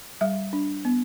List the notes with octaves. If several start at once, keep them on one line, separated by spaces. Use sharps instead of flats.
G3 E5
D4
B3